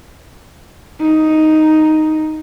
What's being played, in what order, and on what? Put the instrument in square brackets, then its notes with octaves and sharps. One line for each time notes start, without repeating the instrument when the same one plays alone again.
[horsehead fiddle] D#4